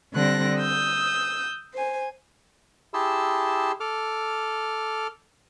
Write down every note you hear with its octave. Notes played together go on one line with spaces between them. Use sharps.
D3 G3 C4 F#6 A#6
D#6 E6 G6
C5 G#5
E4 G4 G#4 A5 C6 E6
A4 D6 F6